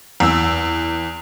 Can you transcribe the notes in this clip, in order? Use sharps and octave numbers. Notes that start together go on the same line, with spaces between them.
E2 E6